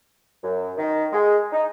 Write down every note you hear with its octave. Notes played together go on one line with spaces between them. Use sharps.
F#2
D#3
G#3
D#4